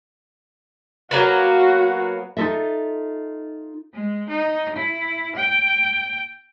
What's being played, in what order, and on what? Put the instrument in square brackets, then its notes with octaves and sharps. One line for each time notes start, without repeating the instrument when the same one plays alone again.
[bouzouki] F#3 A#3 B3 [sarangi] F#4
[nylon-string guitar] D#4 F4 F#4 A4 D#5 E5
[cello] G#3
D#4
E4
G5